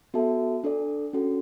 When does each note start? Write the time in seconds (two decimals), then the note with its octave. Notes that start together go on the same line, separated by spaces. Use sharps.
0.14 B3 F#4 A4 E5 A5
0.64 D4 A4 D5
1.13 C#4 F#4 A4